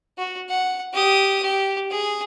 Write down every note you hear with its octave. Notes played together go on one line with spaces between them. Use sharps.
F#4
F#5
G4 D#6
G4
G#4